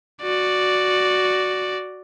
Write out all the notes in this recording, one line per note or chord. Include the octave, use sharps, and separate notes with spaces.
F#4 D5